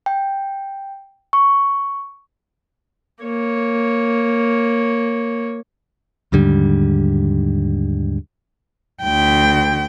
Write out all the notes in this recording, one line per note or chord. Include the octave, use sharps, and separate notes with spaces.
G5
C#6
A#3 C#5
D#2 G#2 D3 G3
D2 G5